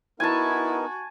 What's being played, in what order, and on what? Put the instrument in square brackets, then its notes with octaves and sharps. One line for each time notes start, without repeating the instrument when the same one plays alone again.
[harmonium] B3 D#4 A#4 [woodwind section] E4 [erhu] F#4 [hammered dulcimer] G#5 A5